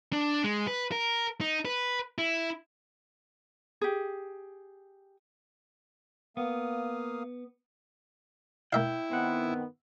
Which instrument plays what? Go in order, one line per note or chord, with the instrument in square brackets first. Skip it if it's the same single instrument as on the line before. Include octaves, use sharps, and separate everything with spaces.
[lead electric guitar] D4
G#3
B4
A#4
D#4
B4
E4
[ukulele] G4 G#4
[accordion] A#3 F5 D#6 [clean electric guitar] B3
[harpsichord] A#3 E5 F5 [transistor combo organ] E4 [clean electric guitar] G5
[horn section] D#3 B3 [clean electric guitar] C4 F#5